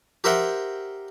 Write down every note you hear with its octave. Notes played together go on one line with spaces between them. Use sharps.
G4 A#4 C5 E5 F#5 G5